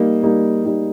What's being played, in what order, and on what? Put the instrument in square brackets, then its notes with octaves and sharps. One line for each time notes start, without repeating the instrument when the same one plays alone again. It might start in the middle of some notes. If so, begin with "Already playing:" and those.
Already playing: [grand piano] G3 A#3 D#4
G3 A#3 D#4
G3 A#3 D#4